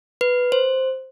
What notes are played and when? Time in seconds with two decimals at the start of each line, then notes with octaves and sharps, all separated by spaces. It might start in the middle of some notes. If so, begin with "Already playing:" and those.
0.21 B4
0.52 C5